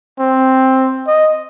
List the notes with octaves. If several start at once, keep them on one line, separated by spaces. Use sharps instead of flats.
C4
D#5